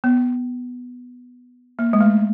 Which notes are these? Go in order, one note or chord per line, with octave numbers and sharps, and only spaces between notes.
B3
A#3
G#3
A3